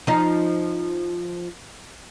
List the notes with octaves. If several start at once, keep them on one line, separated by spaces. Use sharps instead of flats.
F3 D#4